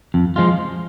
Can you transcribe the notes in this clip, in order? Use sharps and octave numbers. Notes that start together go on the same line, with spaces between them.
F2
F3 G#3 F4